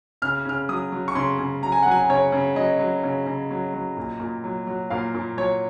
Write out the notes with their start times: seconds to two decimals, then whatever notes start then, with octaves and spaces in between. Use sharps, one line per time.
0.22 C#3 F6
0.45 C#3 F6
0.69 F#3 D#6
0.92 F#3
1.08 C#6
1.15 C#3 C6
1.39 C#3
1.62 F#3 A#5
1.72 G#5
1.83 F#3 F#5
1.91 G#5
2.09 C#3 C#5
2.32 C#3
2.56 F#3 D#5
2.79 F#3
3.03 C#3
3.27 C#3
3.51 F#3
3.74 F#3
3.97 A#2
4.20 A#2
4.44 F#3
4.67 F#3
4.90 A#2 F5
5.14 A#2
5.37 F#3 C#5